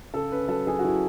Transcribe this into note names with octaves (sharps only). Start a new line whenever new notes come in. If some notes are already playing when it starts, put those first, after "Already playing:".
C#3 A4
C#4 B4
F#3 A4
F#3 G#4
F#4
F#3 E4